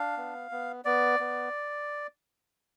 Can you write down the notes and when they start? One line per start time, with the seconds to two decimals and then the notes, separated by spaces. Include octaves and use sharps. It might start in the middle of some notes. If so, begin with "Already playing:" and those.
Already playing: D4 F5
0.17 B3
0.51 B3
0.85 B3 D5
1.20 B3